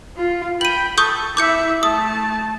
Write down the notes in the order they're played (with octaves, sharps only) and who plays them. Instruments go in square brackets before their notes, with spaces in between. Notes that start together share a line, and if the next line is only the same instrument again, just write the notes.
[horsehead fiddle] F4
[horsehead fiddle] G5 B5 [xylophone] D#7 F#7
[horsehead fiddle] A4 [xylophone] C#6 D#6 G6
[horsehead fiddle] E4 E5 [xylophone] D6 G6 C#7
[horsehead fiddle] A3 A5 [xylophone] D#6